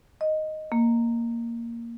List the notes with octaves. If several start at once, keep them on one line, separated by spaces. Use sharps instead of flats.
D#5
A#3